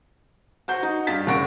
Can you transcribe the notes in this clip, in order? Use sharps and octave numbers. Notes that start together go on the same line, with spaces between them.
F#4 C5 G6
D#4 F#4
G2 F5 A6 B6
F#1 F#2 F#5 C#6 A#6 D7